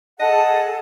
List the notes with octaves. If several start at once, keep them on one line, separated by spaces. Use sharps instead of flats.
G#4 A4 D#5 F#5 A5